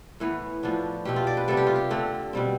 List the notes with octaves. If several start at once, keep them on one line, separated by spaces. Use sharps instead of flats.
A2 E3 B3
A2 F3 B3 D4
B2 A3 C4 G4
F4
D5
B4
C3 G3 B3 D4 A4
G4
F4
G4
D3 A3 C4
B2 G3 C4